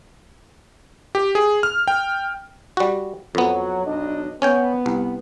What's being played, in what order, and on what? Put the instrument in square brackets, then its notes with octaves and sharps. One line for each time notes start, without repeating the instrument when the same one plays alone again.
[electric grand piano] G4
G#4
F6
G5
[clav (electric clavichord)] G3 F#4
[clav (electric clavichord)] F2 B3 [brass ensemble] F#3
[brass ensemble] B1 D4 D#5
[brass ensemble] B3 [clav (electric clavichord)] C#4 C#5 G5
[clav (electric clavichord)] C2